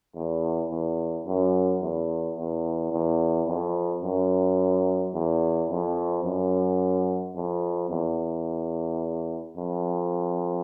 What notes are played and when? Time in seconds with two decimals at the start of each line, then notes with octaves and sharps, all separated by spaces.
0.15 E2
0.70 E2
1.25 F#2
1.82 E2
2.37 E2
2.92 E2
3.47 F2
4.03 F#2
5.13 E2
5.70 F2
6.24 F#2
7.35 F2
7.90 E2
9.57 F2